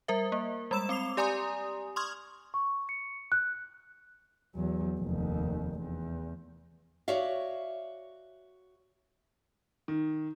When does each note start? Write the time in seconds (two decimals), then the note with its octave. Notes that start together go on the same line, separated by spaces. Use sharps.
0.08 G3 A#4 E5
0.32 A#3
0.71 G3 G#3 B5 E6 E7
0.89 C4 D6 C7 F7
1.17 G4 D5 G#5 A#5 C6 D#6
1.96 C6 C#6 D#6 F6 G#6
2.54 C#6
2.89 C#7
3.32 F#6
4.55 E2 F#3
5.00 F1 D#2
5.79 E2
7.08 F#4 C#5 D5 E5 F5
9.88 D#3